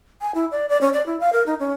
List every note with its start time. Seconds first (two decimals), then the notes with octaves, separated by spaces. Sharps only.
0.21 G#5
0.35 E4
0.51 D5
0.69 D5
0.81 C#4
0.93 D5
1.06 E4
1.20 F5
1.33 A#4
1.46 D#4
1.60 C#4